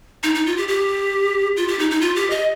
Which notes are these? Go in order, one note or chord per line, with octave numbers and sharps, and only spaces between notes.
D#4
D#4
F4
G4
G4
F4
G4
D#4
D#4
F4
G4
D#5